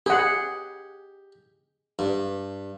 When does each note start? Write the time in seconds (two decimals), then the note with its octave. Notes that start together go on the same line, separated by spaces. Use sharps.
0.06 G4 G#4 F#5
1.99 G2